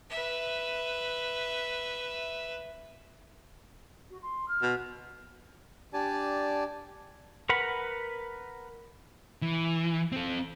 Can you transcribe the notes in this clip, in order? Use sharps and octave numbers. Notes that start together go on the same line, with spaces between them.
B4 E5
F#4
C6
F6
B2
D4 G4 D5 G#5 A5
A#4 B4 F#5 B5
E3
C4 A4